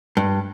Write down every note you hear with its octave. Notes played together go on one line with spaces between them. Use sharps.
G2